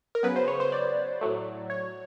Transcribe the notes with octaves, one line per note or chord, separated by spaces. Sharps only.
A#4
C#3 F#3 B3 B4
C5
C#5
C5
D5
A2 F#3 A3
C#5